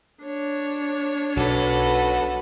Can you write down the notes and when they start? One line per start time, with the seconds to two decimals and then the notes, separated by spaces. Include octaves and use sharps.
0.23 D4 C#5
1.36 B1 F#4 A4 B4